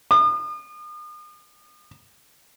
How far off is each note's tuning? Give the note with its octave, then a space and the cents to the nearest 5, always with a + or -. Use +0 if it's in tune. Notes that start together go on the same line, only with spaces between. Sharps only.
D#6 -40